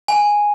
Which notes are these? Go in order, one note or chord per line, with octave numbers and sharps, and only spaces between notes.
G#5